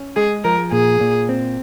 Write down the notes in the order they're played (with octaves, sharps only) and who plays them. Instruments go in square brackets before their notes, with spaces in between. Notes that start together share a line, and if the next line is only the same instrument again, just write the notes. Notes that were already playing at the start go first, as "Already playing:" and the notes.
Already playing: [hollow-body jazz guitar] C#4
[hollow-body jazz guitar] G#3 [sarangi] G#4
[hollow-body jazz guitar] F3 [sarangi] A#4
[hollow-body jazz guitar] A#2 [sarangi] G#4
[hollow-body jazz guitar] A#2
C4